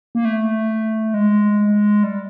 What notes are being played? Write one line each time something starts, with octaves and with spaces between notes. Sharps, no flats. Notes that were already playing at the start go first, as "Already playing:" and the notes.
A#3
A3
G#3
G3